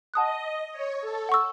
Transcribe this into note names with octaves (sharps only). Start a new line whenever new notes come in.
D#5 F#5 A5 D#6 F#6
C#5
A4
F#5 C#6 E6